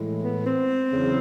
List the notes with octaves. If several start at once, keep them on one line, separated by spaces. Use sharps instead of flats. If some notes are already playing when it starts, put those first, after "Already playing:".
Already playing: A2 E3 G#3
B3
C4
E2 C#3 F#3